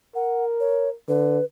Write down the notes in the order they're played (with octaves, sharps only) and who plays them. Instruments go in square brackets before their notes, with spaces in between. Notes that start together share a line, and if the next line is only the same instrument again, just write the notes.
[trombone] A#4 [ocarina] F#5
[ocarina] C#5
[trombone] D3 [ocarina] B4